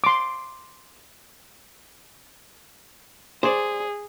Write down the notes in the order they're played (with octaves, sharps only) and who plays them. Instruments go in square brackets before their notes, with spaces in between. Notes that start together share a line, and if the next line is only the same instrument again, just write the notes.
[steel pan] C6 D6
[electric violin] G#4 [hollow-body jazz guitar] C5 D5